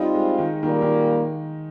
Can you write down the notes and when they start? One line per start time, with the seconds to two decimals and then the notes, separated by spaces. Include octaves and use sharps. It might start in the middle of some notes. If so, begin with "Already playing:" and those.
Already playing: G3 C4 D#4 F4
0.14 G#3
0.38 D#3
0.63 A#2 D#3 G3 A#3
0.82 D#3